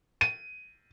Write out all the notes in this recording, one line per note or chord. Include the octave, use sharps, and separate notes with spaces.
D#7